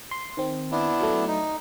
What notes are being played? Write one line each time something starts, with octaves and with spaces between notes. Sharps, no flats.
C6
D#3 C4
B3 D4 E4
F#3 A3
D#4